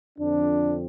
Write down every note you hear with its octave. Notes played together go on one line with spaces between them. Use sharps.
F2 D3 F3 C4 D4